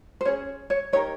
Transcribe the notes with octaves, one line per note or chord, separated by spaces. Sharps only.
C5
C#4 G#4 C#5
C#5
D#4 G4 A#4 C#5